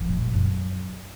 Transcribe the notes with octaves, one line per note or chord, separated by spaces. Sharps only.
F3
B2
A#2
E3
F#2